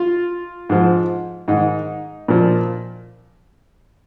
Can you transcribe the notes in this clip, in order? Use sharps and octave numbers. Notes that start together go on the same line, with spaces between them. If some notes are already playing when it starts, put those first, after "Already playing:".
Already playing: F4
G#2 F3
G#2 D#3 D#4
A#2 F3